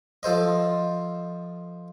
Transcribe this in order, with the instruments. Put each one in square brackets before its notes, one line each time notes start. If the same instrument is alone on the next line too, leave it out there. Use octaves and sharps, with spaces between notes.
[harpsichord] F3 A4 C5 D#5